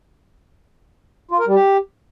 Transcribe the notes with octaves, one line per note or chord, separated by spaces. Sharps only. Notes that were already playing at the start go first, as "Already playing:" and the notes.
F4
A#4
G3
G4